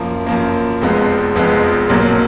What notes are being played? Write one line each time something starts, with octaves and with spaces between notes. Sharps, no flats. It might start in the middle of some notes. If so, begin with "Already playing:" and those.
Already playing: F#2 F3 A#3
F#2 F3 A#3
F1 F2 F3 G#3 B3
F1 F2 F3 G#3 B3
B1 A#2 F#3 A#3